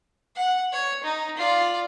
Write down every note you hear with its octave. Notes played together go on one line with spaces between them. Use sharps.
F#5
C#5
D#4
F4 D5